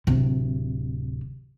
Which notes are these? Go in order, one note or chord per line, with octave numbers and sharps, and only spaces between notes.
D1 C3